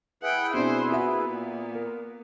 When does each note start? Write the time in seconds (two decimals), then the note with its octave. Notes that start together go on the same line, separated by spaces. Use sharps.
0.23 E4 G#4 B4 F#5 G5
0.54 B2 C4 D4 C5
0.92 A#3 B3 F#4 E5
1.29 A#2
1.75 A#4